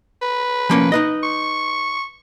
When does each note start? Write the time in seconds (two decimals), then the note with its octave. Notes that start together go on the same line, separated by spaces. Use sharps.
0.22 B4
0.70 F3 A#3 C#4
0.92 D#4 B4 D#5
1.23 C#6